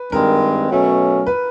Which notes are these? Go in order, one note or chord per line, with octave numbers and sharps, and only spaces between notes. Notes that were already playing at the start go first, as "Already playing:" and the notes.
Already playing: B4
G2 D#3 G#3 C4 A#4
B2 F#3 A3 C#4
B4